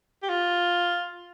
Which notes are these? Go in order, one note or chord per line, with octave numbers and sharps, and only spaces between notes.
G4
F4